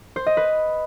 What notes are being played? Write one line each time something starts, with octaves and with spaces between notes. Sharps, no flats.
C5
D#5
B4